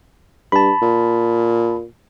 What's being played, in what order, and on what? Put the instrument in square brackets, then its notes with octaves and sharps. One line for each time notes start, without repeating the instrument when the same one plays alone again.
[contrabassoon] G2 [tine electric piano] A5 B5
[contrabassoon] A#2